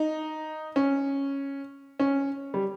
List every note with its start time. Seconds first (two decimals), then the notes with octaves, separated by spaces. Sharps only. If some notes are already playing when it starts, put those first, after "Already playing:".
Already playing: D#4
0.76 C#4
2.00 C#4
2.54 G3